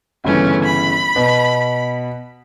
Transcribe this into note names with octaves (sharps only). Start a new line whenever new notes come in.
G1 C#3 E3 A3 C#4
B5
B2 B3